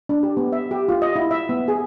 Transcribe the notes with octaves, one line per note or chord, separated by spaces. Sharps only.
D4
G4
B3
E5
G4
F4
D#5
E4
E5
B3
G#4